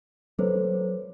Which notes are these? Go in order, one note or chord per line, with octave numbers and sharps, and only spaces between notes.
F#3 A4 B4 C5